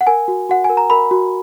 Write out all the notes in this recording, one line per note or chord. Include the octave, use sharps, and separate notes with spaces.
F#5
A#4 G#5
F#4
F#4 F#5
G#5
A#4
A#5
A#4 B5
F#4